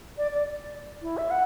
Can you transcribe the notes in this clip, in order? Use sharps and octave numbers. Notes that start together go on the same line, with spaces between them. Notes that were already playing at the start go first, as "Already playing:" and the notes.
D5
D5
E4
E5
F#5